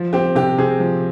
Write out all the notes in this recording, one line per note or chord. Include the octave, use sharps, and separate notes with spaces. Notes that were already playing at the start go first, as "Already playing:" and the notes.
Already playing: F3
C4 G4
C3 G4
C3 G#4
F3